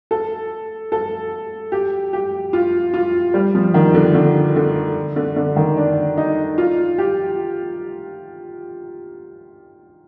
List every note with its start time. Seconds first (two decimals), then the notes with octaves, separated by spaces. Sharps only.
0.11 A4
0.92 A4
1.72 G4
2.13 G4
2.53 F4
2.94 F4
3.34 G3
3.55 F3
3.74 D#3
3.94 D3
4.15 D3
4.56 D3
5.16 D3
5.36 D3
5.56 D#3
5.77 D4
6.17 D#4
6.58 F4
6.98 G4